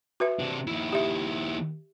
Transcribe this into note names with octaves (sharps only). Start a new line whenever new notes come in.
F#4 B4 E5
C3 D4
D#2 E4
G4 E5